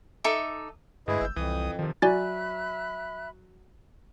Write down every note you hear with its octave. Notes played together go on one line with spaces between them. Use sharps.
D#4 A4 E5 D6
D2 G2 G#3 E4 G#4 B4 D#5 D#6
G1 E6 G6
C2 F2 E3 D#6
C3 D#3 F3
F#3 D5 E5 G#5 B5 F#6 A6